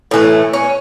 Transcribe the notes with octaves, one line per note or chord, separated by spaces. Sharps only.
A2 E3 A3
C#4